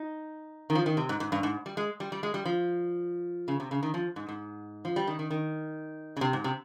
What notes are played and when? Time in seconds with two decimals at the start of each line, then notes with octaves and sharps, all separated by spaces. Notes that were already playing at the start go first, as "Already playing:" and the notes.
Already playing: D#4
0.70 D#3
0.75 F3
0.86 D#3
0.97 C3
1.09 G#2
1.20 G#2
1.32 G2
1.43 G#2
1.66 G3
1.77 G#3
2.00 G3
2.12 G3
2.23 G#3
2.34 G3
2.46 F3
3.48 C#3
3.60 C3
3.71 C#3
3.83 D#3
3.94 F3
4.16 G#2
4.28 G#2
4.85 F3
4.96 G3
5.07 D#3
5.19 D#3
5.30 D#3
6.17 C#3
6.21 C3
6.33 G#2
6.44 C3